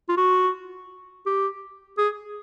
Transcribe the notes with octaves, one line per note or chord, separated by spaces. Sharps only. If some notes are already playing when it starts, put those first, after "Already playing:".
F4
F#4
G4
G#4